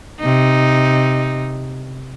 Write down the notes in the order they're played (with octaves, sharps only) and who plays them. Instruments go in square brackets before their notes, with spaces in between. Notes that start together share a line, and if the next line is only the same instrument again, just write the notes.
[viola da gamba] C3 D#4